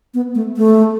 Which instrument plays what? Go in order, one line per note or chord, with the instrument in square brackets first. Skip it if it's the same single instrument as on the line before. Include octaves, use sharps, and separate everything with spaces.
[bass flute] B3
A3
A3